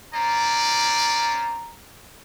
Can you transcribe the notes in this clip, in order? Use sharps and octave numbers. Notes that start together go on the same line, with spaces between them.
C#4 C5 D5 A#5